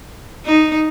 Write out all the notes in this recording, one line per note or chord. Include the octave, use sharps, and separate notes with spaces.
D#4